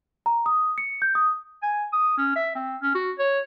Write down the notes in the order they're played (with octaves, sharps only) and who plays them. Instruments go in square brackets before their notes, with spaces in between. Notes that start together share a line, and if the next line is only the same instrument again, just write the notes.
[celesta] A#5
D#6
C#7
G6
D#6
[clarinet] G#5
D#6
C#4
E5
C4
C#4
F#4
C#5